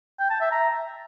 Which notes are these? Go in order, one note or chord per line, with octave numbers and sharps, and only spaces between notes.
G5
A5
E5
A#5